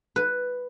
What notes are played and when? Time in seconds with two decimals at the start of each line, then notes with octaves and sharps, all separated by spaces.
0.16 B4